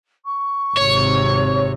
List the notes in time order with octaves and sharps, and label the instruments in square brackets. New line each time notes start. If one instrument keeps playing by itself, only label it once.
[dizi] C#6
[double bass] G#1 C3 [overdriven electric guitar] C#5